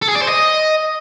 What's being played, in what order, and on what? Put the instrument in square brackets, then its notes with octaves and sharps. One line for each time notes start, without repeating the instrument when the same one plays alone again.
[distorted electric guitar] A4
G#4
D5
C5
D#5